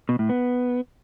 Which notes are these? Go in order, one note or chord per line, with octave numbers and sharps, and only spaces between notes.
B2
A2
B3